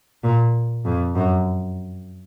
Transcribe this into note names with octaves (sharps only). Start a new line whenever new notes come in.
A#2
F2
F#2